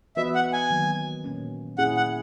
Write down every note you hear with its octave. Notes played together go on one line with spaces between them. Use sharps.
E3 B3 F#4 B4 D#5 E5
F#5
G#5
D#3 F#3 A#3
A#2 A#3 C#4
A#2 A#3 C#4 E4 G#4 F#5
F#5